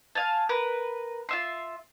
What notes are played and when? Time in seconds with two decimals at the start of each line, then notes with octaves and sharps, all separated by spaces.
0.15 F5 G#5 A5
0.49 A#4 B4
1.29 F4 E5 C6